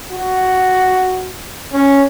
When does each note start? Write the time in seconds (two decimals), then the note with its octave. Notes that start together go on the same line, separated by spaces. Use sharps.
0.12 F#4
1.72 C#4